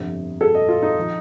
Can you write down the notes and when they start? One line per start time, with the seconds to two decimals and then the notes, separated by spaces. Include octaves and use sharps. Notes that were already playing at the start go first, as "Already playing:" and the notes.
Already playing: G1 F2 C3
0.41 A4
0.55 D#5
0.68 F4
0.83 D#4
0.99 F3